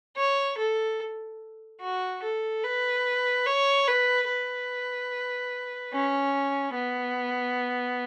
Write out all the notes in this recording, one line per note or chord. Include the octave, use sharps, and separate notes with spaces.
C#5
A4
F#4
A4
B4
C#5
B4
B4
C#4
B3